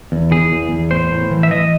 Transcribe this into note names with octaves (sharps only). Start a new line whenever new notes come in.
E2
E3 G#4
E2
E2
A2 C5
A2
E3
E5
E3 D#5